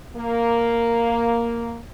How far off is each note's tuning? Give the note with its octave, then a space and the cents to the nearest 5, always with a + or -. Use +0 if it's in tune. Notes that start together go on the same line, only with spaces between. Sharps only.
A#3 +0